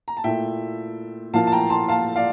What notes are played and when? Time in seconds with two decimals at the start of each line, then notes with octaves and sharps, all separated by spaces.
0.08 A#5
0.17 A5
0.24 A#2 A3 E4 E5 G5
1.33 A#2 F3 A#3 E4 F5 A5
1.47 A5
1.52 G5 A#5
1.70 A5 C6
1.88 F5 A5
2.16 D5 F5